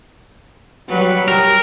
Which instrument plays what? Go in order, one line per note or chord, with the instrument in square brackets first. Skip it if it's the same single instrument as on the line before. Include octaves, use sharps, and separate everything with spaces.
[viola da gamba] F#3 G3 B4
[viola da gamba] G4 [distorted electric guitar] A#4